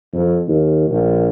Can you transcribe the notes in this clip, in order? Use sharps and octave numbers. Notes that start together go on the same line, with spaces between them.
F2
D#2
A#1